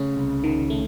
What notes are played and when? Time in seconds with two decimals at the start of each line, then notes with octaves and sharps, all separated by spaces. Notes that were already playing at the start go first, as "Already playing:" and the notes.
Already playing: C#3 A3 C#4
0.16 C2
0.44 D#3
0.70 A3